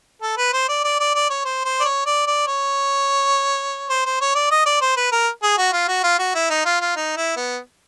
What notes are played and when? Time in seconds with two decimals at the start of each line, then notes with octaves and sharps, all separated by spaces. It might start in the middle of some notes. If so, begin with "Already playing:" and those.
0.22 A4
0.37 B4
0.53 C5
0.69 D5
0.84 D5
1.00 D5
1.15 D5
1.30 C#5
1.45 C5
1.65 C5
1.80 D5
1.85 C#5
2.06 D5
2.27 D5
2.48 C#5
3.90 C5
4.06 C5
4.21 C#5
4.35 D5
4.51 D#5
4.66 D5
4.81 C5
4.97 B4
5.12 A#4
5.43 G#4
5.58 F#4
5.73 F4
5.88 F#4
6.04 F4
6.19 F#4
6.35 E4
6.50 D#4
6.65 F4
6.80 F4
6.96 D#4
7.17 E4
7.36 B3